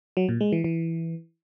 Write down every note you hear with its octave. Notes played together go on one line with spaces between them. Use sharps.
F#3
A#2
G#3
E3
E3